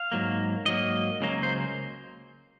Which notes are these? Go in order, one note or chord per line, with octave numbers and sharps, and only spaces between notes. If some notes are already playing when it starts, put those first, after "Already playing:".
Already playing: F5
G#2 F#3 A#3
G#2 F#3 A#3 D#5
C#2 C#3 F#3 A#3
C5